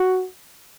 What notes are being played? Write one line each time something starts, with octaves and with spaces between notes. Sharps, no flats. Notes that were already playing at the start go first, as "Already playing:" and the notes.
Already playing: F#4